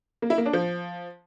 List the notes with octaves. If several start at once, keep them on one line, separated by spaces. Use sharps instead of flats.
A#3
E4
A#3
D4
F3